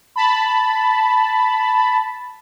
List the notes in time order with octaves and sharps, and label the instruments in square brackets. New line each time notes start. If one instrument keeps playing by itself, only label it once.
[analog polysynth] A5 B5